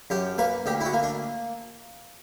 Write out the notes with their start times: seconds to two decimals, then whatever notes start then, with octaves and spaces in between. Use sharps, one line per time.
0.10 F#2 G4
0.38 A#3 B4
0.66 D2 G4
0.81 E4
0.85 F#4
0.93 A#3
1.03 D4